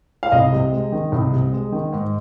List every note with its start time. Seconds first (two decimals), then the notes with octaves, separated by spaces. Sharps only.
0.23 F5
0.32 C2 D#5
0.52 C3
0.72 G#3
0.92 D#3
1.12 C2
1.33 C3
1.53 G#3
1.72 D#3
1.92 G#2